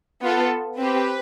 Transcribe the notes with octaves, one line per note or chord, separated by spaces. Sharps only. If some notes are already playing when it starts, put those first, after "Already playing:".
B3 F4 A4
C4 G4 B4